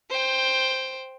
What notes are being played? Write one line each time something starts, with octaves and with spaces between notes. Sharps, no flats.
C5 G5